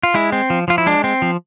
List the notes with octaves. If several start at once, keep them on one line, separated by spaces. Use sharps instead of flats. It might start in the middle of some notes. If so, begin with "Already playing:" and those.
F4
G#3 E4
C4
F3
F3 F4
E4
G#3 D4
C4
F3